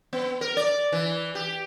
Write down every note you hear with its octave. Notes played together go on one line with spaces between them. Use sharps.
B3
A#4
D5
E3
G4